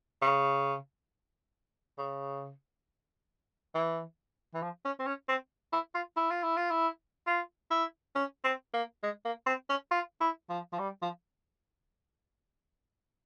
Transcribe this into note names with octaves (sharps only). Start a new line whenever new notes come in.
C#3
C#3
E3
E3
F3
C#4
C4
C#4
C4
E4
F4
E4
F4
E4
F4
E4
F4
E4
C#4
C4
A#3
G#3
A#3
C4
C#4
F4
E4
F3
F3
G3
F3